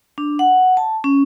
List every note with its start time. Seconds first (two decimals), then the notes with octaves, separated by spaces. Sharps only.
0.18 D4
0.39 F#5
0.77 A5
1.04 C#4